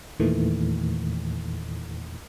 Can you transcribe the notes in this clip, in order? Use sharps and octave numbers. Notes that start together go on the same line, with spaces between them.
E2 A#2 D#3 E3 A3